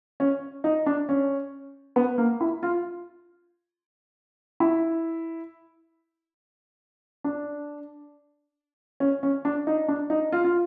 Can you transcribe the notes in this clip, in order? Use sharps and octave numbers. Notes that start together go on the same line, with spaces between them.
C#4
D#4
D4
C#4
B3
A#3
E4
F4
E4
D4
C#4
C#4
D4
D#4
D4
D#4
F4
F4